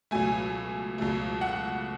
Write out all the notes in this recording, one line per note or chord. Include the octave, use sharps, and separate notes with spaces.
C#2 B2 F#3 A3 G#5
C#2 B2 F#3 A3
F#5